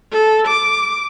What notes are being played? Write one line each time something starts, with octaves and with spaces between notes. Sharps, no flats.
A4
D6